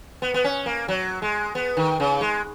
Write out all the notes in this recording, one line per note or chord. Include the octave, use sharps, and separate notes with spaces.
B3
B3
C#4
A#3
F#3
G#3
B3
D#3
C#3
G#3